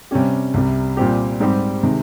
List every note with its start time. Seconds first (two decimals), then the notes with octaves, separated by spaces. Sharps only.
0.11 C3 G3 C#4 G4
0.54 C2 C3 G3
0.97 A#2 G3 C4 G4
1.40 G#2 G3 C4 G4
1.83 C3 D#3 G#3